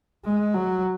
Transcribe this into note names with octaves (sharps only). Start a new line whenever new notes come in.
G#3
F#3